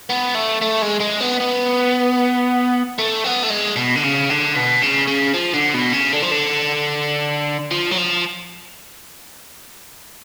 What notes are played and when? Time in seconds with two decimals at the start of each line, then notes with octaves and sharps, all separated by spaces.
0.10 B3
0.35 A3
0.61 A3
0.82 G#3
1.00 G#3
1.20 B3
1.40 B3
2.98 A3
3.24 B3
3.43 A3
3.50 G#3
3.76 B2
3.96 D3
4.04 C#3
4.29 D3
4.55 B2
4.82 C#3
5.07 C#3
5.34 F3
5.54 D3
5.74 B2
5.93 C#3
6.13 D3
6.22 F3
6.31 D3
7.71 F3
7.91 F#3
7.97 F3